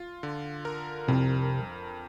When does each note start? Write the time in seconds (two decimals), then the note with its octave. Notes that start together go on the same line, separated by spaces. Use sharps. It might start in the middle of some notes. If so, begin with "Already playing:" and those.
Already playing: F4
0.23 D3
0.65 A#4
1.08 C2 F2 C3